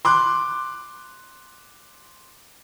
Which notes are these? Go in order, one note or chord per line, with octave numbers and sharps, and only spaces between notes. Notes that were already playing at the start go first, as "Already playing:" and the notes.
C6 D6 F#6